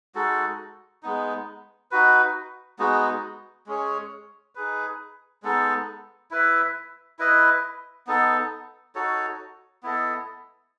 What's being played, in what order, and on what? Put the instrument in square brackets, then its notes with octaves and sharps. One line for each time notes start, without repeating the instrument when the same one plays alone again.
[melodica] G#3 D#4 F#4 A4
G#3 B3 D#4
D#4 F#4 B4
G#3 B3 D#4 F#4
G#3 C#4 G#4 C#5
D#4 G#4 B4
G#3 B3 D#4 A4
E4 B4 E5
E4 B4 D#5
B3 D#4 A4
D#4 F#4 A4 C#5
B3 E4 A4 D#5